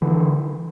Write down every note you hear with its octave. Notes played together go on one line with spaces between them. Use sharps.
D3 E3